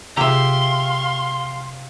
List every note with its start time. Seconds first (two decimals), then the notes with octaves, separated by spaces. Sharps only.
0.17 C3 F4 G4 G#4 E5 F5 A#5 C6